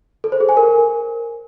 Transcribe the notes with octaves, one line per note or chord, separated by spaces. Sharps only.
A4
C5
G#4
G#5
A#4